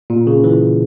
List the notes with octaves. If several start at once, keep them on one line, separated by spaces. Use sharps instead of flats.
A#2
C#3
E3